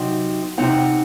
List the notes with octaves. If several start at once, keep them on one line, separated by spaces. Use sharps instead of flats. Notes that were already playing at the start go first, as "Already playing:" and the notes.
Already playing: C3 F#3 C4 D#4
C3 F#3 C4 D#4 F#5